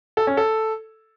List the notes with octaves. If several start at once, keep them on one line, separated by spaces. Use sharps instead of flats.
A4
C#4
A4